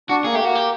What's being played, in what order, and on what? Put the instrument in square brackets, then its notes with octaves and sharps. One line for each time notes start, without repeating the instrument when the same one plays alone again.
[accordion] D4 [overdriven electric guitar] F#4
[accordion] A#3 [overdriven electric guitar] G#4
[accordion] A3 [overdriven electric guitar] G4
[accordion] A#3 [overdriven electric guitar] F#4
[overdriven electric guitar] G4